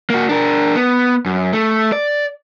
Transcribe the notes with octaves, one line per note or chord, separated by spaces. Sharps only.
A#3 F#4
D4 A#4
B3
F#2
A3
D5